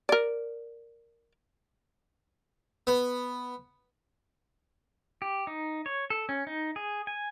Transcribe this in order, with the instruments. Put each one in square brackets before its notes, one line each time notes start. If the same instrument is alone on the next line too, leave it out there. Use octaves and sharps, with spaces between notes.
[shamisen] A#4 D5
[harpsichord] B3
[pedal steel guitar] G4
D#4
C#5
A4
C#4
D#4
G#4
G#5